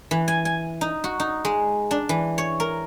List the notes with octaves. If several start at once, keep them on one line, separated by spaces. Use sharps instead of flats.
E3
G#5
G#5
D#4
F#4
D#4
G#3
D4
E3
C#5
A#4